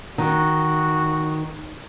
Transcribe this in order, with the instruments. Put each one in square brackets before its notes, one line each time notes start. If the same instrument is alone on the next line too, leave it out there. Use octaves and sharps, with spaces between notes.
[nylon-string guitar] D#3 [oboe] F#4